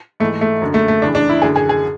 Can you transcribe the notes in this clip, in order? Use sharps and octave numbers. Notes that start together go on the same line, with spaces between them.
G#2 E3 A3
A3
F#2 D3
A3
A3
E2 C#3 E3 D4
D4
E4
F#2 D3 G#4
G#4
G#4